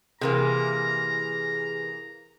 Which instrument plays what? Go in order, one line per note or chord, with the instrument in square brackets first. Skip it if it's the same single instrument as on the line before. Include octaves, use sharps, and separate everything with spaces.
[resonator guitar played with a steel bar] C3 E3 A#3 [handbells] G#4 A#4 [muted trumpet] A#5